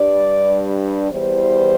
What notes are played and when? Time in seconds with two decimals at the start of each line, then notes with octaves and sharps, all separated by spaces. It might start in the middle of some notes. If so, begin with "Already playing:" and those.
Already playing: G2 G3 D4 D5
1.11 E2 E3 G3 C5